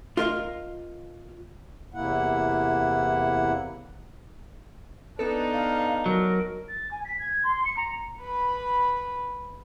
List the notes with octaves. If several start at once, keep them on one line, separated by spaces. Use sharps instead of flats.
F4 A#4 D#5 F5
E2 C3 A#3 E4 F#5
B3 D4 D#4 A4
F5
F#3 A#4
A6
G#5
B6
G#6
C6
C#7
A#5
B4 B5